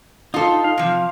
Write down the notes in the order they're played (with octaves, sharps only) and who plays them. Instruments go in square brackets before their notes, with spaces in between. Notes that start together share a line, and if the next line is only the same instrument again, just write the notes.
[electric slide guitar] D#4 [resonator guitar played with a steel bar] F4 A4
[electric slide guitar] F5
[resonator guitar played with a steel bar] C3 F3